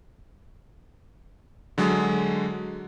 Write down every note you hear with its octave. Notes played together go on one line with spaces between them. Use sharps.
D3 F#3 G#3